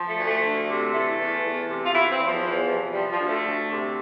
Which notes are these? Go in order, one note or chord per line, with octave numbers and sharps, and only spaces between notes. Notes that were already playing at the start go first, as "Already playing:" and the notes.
Already playing: F3
A3
D2
A3
D2
C3
E3 A3
E2
E2
C3
F4
E3 E4
C4
E2
F3
E2
C3
F3 G3
F3
D2
A3
D2
C3